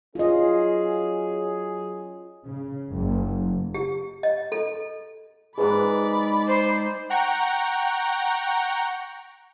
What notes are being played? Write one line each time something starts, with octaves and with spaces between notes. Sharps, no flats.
F#3 C#4 F4 G#4 D#5
C#3
F#1
G4
D#5
A4
G#2 D#4 G#4 B4 D5 B5
C5
F#5 G5 A#5 C#6